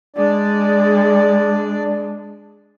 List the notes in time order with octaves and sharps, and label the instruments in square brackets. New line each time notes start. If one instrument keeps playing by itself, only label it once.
[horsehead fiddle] G#3 [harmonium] D4 D5